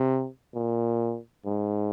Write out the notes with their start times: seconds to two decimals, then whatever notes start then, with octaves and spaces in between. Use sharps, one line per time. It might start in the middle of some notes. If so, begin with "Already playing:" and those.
Already playing: C3
0.54 A#2
1.45 G#2